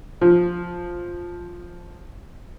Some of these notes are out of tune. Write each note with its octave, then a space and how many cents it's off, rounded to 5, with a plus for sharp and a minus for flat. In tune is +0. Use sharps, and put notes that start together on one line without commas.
F3 +5